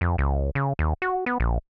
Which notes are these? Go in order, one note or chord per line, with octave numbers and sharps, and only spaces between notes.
F2
C#2
C#3
D#2
F#4
B3
A#1